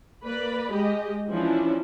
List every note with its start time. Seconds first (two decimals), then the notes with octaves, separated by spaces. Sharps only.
0.24 A#3 B4 D5 B5
0.72 G#3 G4 D#5
1.29 E3 F3 C#4 D4 E4